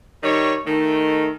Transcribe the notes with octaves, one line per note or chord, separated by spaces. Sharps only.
D#3 G3 C#5
D#3 A3